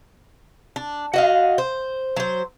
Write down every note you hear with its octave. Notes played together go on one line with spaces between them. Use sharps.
D4
F#4 D#5 F5
C5
F#3 C5